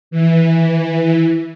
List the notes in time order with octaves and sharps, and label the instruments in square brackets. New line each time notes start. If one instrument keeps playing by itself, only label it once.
[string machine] E3